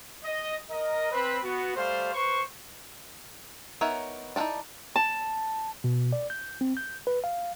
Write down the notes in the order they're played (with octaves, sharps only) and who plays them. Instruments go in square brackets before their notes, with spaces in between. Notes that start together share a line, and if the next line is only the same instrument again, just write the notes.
[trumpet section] D#5
A#4 D#5
C4 B4
B3 F#4
G3 A3 C5 F5
B4 C5 C#6
[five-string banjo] B3 D#4 A#4 C#5 E5
D#4 E4 F#4 A4 D5
[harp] A5
[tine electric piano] B2
D5
G6
C4
G6
B4
F5